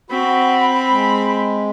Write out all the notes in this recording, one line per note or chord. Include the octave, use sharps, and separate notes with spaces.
C4 F#4 B5
G#3